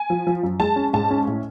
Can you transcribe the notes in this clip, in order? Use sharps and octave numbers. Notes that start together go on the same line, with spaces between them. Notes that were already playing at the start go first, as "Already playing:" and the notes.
Already playing: G#5
F3
F3
F#2
G#3 A5
C#4
G#2 A5
C#4
A2